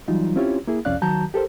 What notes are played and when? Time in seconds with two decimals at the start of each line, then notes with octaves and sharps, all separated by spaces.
0.08 E3 F#3 G3 D#4 F4
0.36 C4 C#4 E4 F4 G4 C#5
0.67 A#3 E4 G#4
0.85 C2 F2 C#4 D5 F5 F#6
1.02 D#3 F#3 F#4 A5 A#5 G6
1.34 G4 A4 A#4 C5